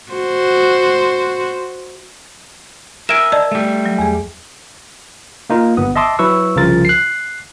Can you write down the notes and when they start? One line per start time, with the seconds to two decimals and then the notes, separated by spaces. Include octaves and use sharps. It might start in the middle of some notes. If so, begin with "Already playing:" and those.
0.12 F#4 C5
3.09 A#4 E5 G#5 D7 E7
3.32 D5 D#5 A5 E6
3.52 G3 A3
3.86 F#3
3.99 E2 G#4
5.50 A#3 D#4 F4 A#4
5.77 G1 B3 D#6
5.95 D#5 E5 A5 C6 D6 D#6
6.19 F#3 E4 B4 C#6 E6
6.56 C2 C#3 F3 F4 A#4 A6
6.85 F#6 C7